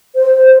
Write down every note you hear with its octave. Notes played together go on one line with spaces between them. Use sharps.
C5